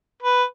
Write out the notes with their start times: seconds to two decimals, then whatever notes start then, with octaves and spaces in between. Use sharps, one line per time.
0.22 B4